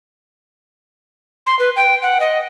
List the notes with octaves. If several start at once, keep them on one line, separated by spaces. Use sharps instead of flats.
C6
B4
G5
F#5
D#5